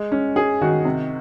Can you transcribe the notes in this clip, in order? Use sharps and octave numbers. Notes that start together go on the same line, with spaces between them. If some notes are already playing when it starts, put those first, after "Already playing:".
Already playing: G#3
C#4
C#4 G#4
D#3 F#4
C3